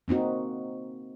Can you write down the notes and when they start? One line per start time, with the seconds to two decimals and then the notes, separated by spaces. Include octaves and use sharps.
0.08 A#3 C4 D#4 F#4